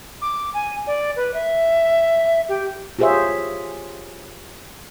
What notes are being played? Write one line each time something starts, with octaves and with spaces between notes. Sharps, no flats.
D6
G#5
D5
B4
E5
G4
F4 G4 G#4 C5 C#5 E5